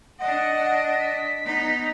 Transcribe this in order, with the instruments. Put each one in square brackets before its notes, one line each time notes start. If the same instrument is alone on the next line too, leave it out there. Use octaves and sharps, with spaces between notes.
[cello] D4 D#5 [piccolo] F#5
[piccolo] B6
[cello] B3 D#4